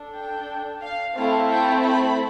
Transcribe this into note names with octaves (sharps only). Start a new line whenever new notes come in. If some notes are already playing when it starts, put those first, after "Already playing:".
Already playing: D4 A4
G5
F5
A3 C4 E4 A4 F5
G5
B5